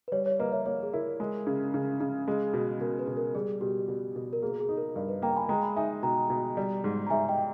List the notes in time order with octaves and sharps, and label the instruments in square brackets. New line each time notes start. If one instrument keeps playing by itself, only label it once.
[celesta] B4
[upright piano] G3 [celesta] C#5
[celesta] C#5
[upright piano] A#3 [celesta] B4 D#5
[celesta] C#5 E5
[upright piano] A#3 [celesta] C#5
[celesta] G#4
[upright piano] E4 [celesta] A#4
[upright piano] G#3
C#3
C#3
C#3
[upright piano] G#3 [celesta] G#4
[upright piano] B2
[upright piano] B2 [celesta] A#4
[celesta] B4
[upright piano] B2
[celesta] A#4
[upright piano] G3 [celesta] G#4
[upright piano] B2 [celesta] G4
[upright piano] B2
B2
[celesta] A#4
[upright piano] A#3 [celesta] G#4
[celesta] G#4
[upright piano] D#4
[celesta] A#4
[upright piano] G2 [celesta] A#4
[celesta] B4
[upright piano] A#3 [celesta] G5 A#5
[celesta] G#5 B5
[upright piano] G#3 [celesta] G5 A#5
[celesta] G#5 B5
[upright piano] D#4 [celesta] E5 G#5
[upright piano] B2 [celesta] G5 A#5
[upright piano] B2
G3
G#2
[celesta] A#5
[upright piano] G#2 [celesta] E5 G#5
[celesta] D#5 G5